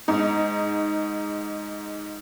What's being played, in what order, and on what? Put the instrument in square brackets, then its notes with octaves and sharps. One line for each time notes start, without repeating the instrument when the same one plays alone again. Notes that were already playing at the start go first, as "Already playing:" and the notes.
[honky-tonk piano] G#2 D#4